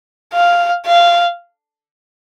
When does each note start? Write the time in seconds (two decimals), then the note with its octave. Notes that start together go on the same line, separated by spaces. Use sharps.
0.34 F5
0.86 F5